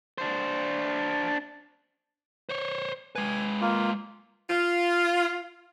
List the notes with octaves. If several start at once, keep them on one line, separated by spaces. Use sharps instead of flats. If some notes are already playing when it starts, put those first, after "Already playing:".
D4 C5
C5 C#5
G#3 B4 G#5
A#3 F4
F4